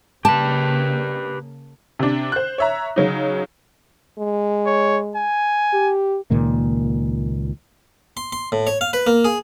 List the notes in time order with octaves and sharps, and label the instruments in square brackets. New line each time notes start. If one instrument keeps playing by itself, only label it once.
[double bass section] C#3 A#3 [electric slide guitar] G4 B4 [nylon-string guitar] A5
[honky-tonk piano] C3 D4
C5 F#6
C#5 E5 A#5
C#3 F#3 C#4 D#4
[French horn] G#3
[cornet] C#5
G#5
[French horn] G4
[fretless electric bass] C#2 A#2 D#3 A#3
[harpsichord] C6
C6
A2
C#5
F5
B4
A#3
G#4